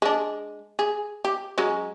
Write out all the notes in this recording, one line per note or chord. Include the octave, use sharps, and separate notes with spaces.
G#3 D4
G#4
G4
F#3 G#3 C#4